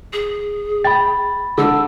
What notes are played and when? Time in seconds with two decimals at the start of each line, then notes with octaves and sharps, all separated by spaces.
0.13 G#4
0.84 G5 B5 A6
1.58 D3 E6